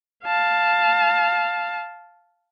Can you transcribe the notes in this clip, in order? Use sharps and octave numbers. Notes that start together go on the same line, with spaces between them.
F5 A5